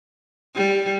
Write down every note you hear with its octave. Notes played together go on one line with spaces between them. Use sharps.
G3